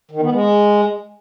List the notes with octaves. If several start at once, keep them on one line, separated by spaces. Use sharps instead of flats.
D#3
B3
G#3